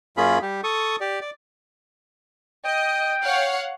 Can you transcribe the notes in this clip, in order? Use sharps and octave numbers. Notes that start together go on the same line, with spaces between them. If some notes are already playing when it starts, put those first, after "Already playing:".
F#2 A#3 C#4 F4 G#4 B5
G3 G4
A4 C#6 D#6
G4 D5
D5
D#5 G5
C#5 F5 F#5